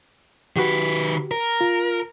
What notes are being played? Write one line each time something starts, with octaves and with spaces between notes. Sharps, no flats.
D#3 F#4 G4 B4
A#4
F4